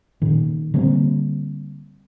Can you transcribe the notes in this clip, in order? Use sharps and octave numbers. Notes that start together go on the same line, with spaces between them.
A#2 D#3
D3 G3 A#3 C4